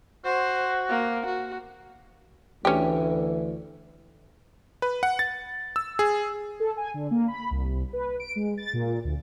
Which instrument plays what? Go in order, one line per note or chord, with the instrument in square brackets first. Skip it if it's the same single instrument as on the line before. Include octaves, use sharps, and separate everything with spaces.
[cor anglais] F#4 [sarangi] C5
[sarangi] A#3
F#4
[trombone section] D2 E3 [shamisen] C#4 G4
[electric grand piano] B4
F#5
A6
E6
G#4
[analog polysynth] A4
G#5
D3
A#3
B5
C2
B4
D7
G#3
A6
A#2
D2